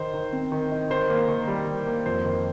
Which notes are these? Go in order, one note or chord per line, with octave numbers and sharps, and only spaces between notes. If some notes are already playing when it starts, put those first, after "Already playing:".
Already playing: D#3 D#4 C5
D#3
C4
D#3
D#4
D#3 C5
A#3
D#3
G3
D#3
A#3
F2 C5
D#3